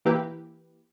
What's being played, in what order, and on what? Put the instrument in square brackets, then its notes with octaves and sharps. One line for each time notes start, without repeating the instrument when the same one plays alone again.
[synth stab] E3 A#3 E4 G4 B4